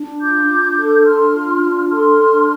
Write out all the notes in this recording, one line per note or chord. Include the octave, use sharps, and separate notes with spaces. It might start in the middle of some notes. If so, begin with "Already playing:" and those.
Already playing: D4
F4 D6 G6
D4
A4
D4 C6 F6
F4
D4
A4 C6 F6
D4